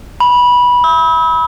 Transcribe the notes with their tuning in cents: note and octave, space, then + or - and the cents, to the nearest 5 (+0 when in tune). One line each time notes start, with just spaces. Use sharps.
B5 -15
E6 -45